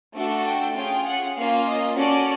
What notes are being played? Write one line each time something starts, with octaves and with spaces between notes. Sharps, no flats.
A3 D4 F#4 A4
G5
C#4 F4 G#4 G5
F#5
A#3 C#4 F4 F5
D#5
C#4 F#4 A4 D5